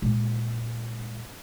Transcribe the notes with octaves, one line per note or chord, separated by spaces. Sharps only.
A#2 G#3